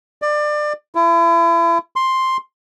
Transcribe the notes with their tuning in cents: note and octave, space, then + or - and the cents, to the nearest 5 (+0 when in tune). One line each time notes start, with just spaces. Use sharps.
D5 +25
E4 +35
C6 +5